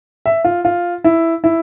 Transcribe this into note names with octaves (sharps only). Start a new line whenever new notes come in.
E5
F4
F4
E4
E4